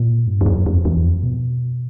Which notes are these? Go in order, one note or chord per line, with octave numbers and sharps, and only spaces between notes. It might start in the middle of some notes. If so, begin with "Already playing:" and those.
Already playing: A#2
G2
F2
F#2
F2
E2
F2
B2